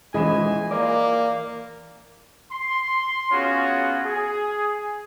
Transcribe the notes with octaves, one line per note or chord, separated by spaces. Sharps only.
G#2 E3 F3 G#4 D#5 G#5 B5 E7
A#3 A#4 D5
C6
B3 C#4 F4 F#4 G#4 C#5
G#4